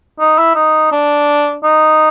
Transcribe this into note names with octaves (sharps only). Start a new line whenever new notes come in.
D#4
E4
D#4
D4
D#4